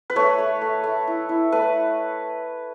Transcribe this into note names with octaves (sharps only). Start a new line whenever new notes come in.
B4
A3 C#5
A3
A3
A3
E4
E4
A3 B4